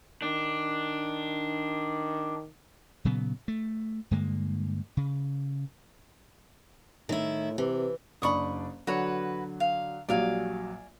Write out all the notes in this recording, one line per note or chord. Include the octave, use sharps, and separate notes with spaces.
D#3 D4
A#2 C#3 F#3 B3
A3
G2 D3 G#3 A#3
C#3
A2 D#3 E4
C3 E3
F#1 D4 B5 C#6 D#6
D3 F#3 F#4 B4 C#5
F5
A#1 F#3 G3 D5 F5 G#5